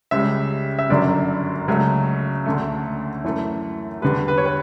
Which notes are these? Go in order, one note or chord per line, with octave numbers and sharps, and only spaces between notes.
C#2 C#3 G3 E5
E5
G1 F#2 D3 F#3 D5
C#2 C#3 F#3 A3
D2 D3 A3
F#2 E3 A3
E2 D3 G3 B4
B4
C#5
B4